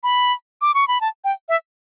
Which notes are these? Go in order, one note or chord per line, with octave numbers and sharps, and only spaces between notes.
B5
D6
C#6
B5
A5
G5
E5